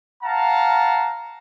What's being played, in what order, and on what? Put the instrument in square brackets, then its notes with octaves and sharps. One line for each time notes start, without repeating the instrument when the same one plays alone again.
[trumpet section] F5 F#5 A5 A#5